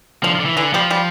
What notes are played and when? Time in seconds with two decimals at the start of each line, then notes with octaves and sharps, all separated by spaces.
0.23 D3 F3 D4
0.35 F3
0.40 D3
0.46 E3
0.57 D3 E3 E4
0.73 F3 G3 G4
0.90 G3 G4